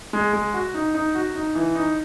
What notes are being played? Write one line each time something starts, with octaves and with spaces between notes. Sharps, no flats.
G#3
G#3
F#4
D#4
D#4
F#4
D#4
E3
D#4